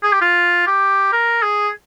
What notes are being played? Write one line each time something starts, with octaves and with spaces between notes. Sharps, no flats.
G#4
G4
F4
G4
A#4
G#4